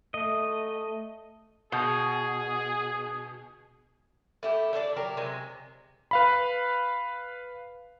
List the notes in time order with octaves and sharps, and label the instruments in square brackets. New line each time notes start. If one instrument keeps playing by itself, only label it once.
[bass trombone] A3 [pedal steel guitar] D#5
[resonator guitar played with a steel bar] B2 [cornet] G#4
[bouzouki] A3 E4 G4
D4 A4 C#5 D5
F#3 G4 A#4
C3 G#3
[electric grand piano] B4 F5 B5